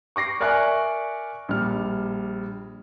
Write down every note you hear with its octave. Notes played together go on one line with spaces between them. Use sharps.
C#6 D6 A#6 C7
A#4 D5 E5 G#5 C#6 F#6
A#1 G3 F6